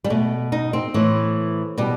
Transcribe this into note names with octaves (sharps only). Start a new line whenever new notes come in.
G3
B2 A3
D#4
C4
A2 E3
B2 G3